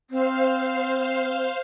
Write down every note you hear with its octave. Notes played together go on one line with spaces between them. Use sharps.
C4 C5 F5